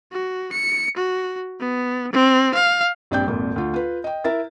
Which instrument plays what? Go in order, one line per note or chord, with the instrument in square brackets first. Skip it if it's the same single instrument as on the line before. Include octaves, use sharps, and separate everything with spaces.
[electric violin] F#4
C#7
F#4
B3
C4
F5
[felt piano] A#1 G2 C4 D5 G5 G6
G#1 F2 A#2
D2 F4
F4 B4
D#5 G5
E4 A#4 E5 A6